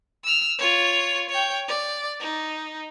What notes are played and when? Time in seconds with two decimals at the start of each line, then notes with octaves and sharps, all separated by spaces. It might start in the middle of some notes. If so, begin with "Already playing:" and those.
0.24 E6 F6
0.58 F4 C#5
1.30 C#5 G5
1.68 D5
2.20 D#4